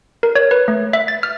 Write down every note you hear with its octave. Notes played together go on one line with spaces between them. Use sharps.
A#4
C#5
B4
A3
E5
A6
F6